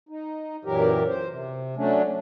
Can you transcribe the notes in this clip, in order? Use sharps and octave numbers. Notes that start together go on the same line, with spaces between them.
D#4
F#2 A#2 E3 F#3 G4 A#4
C5
C3
F#3 A3 C#4 D4